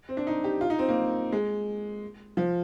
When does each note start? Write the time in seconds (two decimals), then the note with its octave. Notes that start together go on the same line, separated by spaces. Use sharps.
0.09 C4
0.17 D4
0.27 D#4
0.44 G4
0.61 F4
0.70 D#4
0.79 C4
0.88 A#3
1.32 G#3
2.37 F3